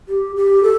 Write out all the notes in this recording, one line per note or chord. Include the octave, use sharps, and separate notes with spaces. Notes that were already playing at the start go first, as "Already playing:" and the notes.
G4
G4
A4